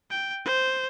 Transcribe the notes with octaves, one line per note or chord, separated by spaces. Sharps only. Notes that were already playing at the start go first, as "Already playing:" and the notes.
G5
C5